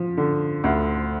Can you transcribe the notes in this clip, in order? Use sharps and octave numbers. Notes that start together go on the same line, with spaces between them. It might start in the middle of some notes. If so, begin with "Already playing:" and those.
Already playing: F3
D3
D2